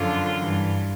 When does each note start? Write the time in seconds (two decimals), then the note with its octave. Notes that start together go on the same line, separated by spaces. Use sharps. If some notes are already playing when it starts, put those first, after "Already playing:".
Already playing: F#2 D3 F3 F4
0.38 G2 E3